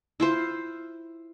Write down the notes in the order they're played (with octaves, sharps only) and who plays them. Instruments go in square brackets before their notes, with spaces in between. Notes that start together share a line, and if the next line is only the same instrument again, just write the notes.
[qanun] E4 F4 C5